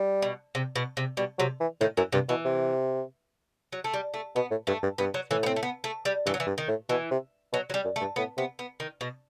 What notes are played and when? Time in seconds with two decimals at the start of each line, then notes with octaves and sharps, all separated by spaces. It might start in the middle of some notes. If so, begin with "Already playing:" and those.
Already playing: G3
0.22 B2
0.55 C3
0.76 B2
0.97 C3
1.17 B2 G3
1.38 C3 F#3
1.60 E3
1.81 A2 D#3
1.97 F#2 E3
2.12 G2 C3
2.29 B2 E3
2.45 C3
3.72 F#3
3.84 A3
3.93 G3
4.14 A3
4.36 B2 B3
4.51 A2
4.67 G2 A3
4.83 G2
4.98 G2 B3
5.14 F#3
5.31 A2 E3
5.43 B3
5.46 C4
5.56 A3
5.63 B3
5.84 A3
6.05 G3
6.26 G2 E3
6.34 F#3
6.40 E3
6.47 G2
6.58 D#3
6.68 A2
6.89 B2 E3
7.11 C3
7.53 B2 F#3
7.70 F#3
7.74 G3
7.85 F#2
7.96 A3
8.01 G2
8.16 A2 B3
8.37 C3 B3
8.59 B3
8.80 D#3
9.01 B2